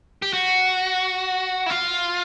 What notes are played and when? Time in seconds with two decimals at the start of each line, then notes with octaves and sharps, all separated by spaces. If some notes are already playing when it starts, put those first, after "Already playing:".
0.22 G4
0.33 F#4
1.66 E4
1.70 F4